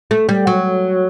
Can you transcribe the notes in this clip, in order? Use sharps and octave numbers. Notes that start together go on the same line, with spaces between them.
A3
G3
F#3